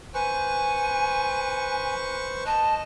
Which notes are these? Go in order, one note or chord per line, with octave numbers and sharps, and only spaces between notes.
B4 C5 G#5 C#6
D#5 A5